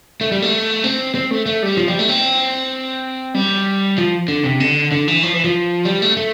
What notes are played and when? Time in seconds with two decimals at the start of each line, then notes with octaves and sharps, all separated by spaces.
0.21 A3
0.32 G3
0.42 A3
0.84 C4
1.15 C4
1.31 A3
1.46 A3
1.63 G3
1.77 F3
1.88 G3
1.99 A3
2.09 C4
3.34 G3
3.98 F3
4.28 D3
4.44 C3
4.60 D3
4.92 D3
5.08 E3
5.23 F3
5.34 E3
5.44 F3
5.85 G3
6.02 A3
6.17 A3